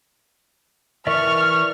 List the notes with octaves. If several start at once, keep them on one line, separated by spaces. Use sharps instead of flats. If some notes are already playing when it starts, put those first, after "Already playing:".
E3 A#4 D5 E5 C#6 F6